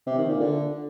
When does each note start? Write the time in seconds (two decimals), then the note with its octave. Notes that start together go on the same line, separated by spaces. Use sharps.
0.07 C3
0.18 D#3
0.29 A#2
0.40 D3